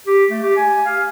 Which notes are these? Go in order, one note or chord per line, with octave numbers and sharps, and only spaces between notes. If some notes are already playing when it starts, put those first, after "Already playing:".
G4
A3
G4
G#5
F5